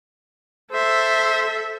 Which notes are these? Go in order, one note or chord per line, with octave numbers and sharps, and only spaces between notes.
A4 C5 E5